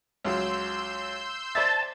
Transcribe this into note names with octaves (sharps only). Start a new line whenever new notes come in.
C#2 F#3 C6 E6 G6
C5 D5 E5 A5